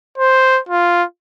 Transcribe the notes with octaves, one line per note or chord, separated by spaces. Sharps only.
C5
F4